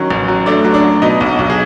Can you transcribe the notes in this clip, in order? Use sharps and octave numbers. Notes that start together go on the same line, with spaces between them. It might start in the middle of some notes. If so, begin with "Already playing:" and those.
Already playing: D#3 F#3 C#4
A1
F#3
A3 D4
F#3
D4
F#3
B2 D#4
B1
B1
G#4